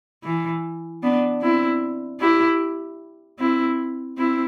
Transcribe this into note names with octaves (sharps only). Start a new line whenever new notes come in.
E3
B3 D4
C4 E4
E4 G4
C4 E4
C4 E4